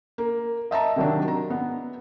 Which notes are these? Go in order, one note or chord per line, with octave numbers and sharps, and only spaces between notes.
A#3
D#5 E5 A5 A#5
C3 D#3 F#3 D4
A#5
B3